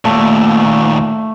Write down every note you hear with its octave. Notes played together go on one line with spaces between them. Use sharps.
D#2 A#2 A3